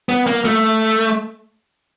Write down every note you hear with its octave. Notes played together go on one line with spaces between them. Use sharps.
B3
A#3
A3